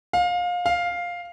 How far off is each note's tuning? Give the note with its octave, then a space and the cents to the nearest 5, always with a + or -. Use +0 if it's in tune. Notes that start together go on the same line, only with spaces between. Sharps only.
F5 +25
F5 +5